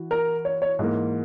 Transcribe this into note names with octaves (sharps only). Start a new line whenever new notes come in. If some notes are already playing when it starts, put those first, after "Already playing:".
Already playing: E3 F#4
A#4
C#5
C#5
G#2 E3 A#3